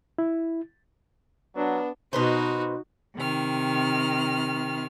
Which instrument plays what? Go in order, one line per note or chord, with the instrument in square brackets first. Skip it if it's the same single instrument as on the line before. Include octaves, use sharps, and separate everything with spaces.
[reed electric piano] E4
[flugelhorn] F#3 [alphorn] B3 [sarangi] D4
[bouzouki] B2 B4 C5 [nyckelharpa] D#4 F#4
[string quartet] C3 D#3 F6